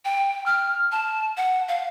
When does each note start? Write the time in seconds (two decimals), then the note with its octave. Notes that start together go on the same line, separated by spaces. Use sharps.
0.05 G5
0.46 F6
0.92 A5
1.37 F#5
1.68 F5